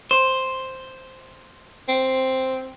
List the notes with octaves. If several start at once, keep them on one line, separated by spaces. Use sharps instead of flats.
C5
C4